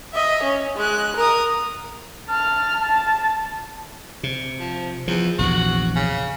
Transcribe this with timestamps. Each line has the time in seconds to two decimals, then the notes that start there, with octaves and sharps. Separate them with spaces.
0.13 D#5 E5
0.43 C#4
0.77 G#3 F#6
1.16 A#4 D#6
2.29 A5 F6
2.82 A5
4.23 C3
4.59 F3
5.08 E2 F3
5.39 A#1 E2 C3 F#4
5.96 C#3